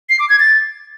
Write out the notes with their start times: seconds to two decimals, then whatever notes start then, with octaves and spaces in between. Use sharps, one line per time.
0.09 C7
0.19 D6
0.29 G#6
0.39 A6